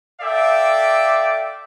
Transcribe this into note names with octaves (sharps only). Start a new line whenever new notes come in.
A4 D5 E5 F5 G5 D6